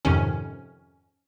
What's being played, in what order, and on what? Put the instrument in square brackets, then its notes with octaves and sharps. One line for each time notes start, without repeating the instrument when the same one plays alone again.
[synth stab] F2 G#2 C3 D#3 C#4